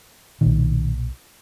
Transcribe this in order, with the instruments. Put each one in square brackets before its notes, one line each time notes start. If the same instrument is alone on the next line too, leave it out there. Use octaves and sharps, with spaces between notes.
[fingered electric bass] B1 A#2 D#3